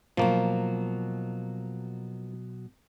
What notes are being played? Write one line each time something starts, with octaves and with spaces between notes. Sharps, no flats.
B2 F3 F#3 A#3